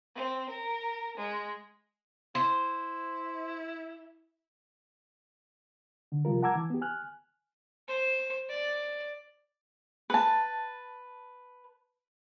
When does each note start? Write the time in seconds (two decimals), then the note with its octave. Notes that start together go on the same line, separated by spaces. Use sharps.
0.13 C4
0.48 A#4
1.16 G#3
2.35 E4 C5
6.12 D3
6.25 C3 F3 G3 F4 A#4
6.43 F#5 A5 A#5 D6 E6 G#6
6.55 E3
6.70 B3 G4
6.81 G#5 F6 F#6
7.88 C5
8.50 D5
10.10 B4 A5